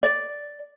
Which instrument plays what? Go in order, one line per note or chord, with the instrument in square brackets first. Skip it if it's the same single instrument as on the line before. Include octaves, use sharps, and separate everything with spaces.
[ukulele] D5